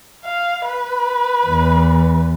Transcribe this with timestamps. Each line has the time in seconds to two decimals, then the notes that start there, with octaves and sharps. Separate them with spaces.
0.25 F5
0.67 B4
1.46 E2